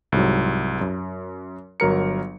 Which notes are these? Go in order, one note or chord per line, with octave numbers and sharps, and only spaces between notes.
C2 G#2 F#3
F#2
G1 F#3 A#4 C#7